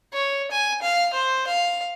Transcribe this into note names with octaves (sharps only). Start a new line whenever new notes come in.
C#5
G#5
F5
C5
F5